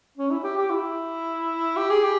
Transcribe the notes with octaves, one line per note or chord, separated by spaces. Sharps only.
C#4
E4
G4
G4
E4
G4
G#4
G4